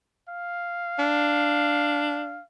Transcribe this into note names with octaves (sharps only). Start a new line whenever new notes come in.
F5
D4